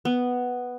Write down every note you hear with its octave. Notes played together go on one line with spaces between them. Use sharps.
B3